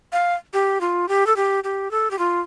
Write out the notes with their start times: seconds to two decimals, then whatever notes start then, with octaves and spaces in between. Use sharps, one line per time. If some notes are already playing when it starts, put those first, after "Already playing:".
0.13 F5
0.53 G4
0.81 F4
1.08 G4
1.27 A4
1.36 G4
1.64 G4
1.91 A4
2.11 G4
2.19 F4